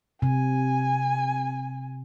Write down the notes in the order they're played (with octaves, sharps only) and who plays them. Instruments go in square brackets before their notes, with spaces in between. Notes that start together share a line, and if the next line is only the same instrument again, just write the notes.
[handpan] C3 [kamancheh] G#5